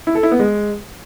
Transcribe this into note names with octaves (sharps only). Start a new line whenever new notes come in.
E4
A4
E4
B3
G#3